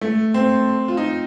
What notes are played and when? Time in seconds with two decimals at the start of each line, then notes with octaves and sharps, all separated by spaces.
0.01 A3
0.34 C4
0.88 F4
0.97 D#4